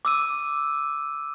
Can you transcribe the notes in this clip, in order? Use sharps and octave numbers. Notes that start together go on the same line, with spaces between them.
D6 E6 D#7